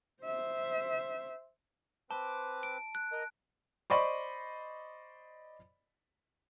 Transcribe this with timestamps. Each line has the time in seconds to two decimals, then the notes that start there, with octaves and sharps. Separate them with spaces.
0.24 C5 E5
2.11 C4 B4 A5 D6
2.63 D7
2.95 F#6
3.12 A#4 D#5
3.90 C5 D5 D#5 B5 C#6